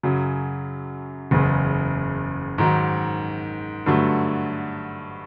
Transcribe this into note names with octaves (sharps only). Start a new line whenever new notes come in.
F#2 C#3 F#3
F#1 E2 C#3
G#2 D#3 F#3
G2 D3 F#3 A3